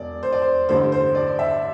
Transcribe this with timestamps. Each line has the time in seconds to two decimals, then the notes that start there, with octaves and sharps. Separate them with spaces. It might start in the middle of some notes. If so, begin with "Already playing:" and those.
Already playing: E1 D5
0.23 C5
0.33 D5
0.42 C5
0.69 A1 G2 D3 G3 C5
0.92 C5
1.15 D5
1.39 E5